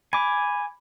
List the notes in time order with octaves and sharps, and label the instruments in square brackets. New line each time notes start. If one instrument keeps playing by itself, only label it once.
[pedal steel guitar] G#5 D6 [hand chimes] B5